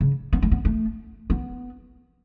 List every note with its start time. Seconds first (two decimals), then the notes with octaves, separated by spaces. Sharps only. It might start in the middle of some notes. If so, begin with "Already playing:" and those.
0.01 C#3
0.33 B3
0.42 A3
0.51 B3
0.65 A3
1.30 B3